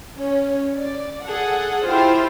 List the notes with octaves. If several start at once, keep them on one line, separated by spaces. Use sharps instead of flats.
C#4
D5
G#4 A4 F#5
E4 F4 G4 C5